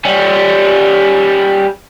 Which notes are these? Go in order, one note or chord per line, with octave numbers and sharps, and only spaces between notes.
G3 C#4